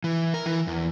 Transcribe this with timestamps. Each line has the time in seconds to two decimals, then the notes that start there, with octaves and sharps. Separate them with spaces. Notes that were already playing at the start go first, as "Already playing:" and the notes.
0.04 E3
0.34 A#4
0.46 E3
0.67 E2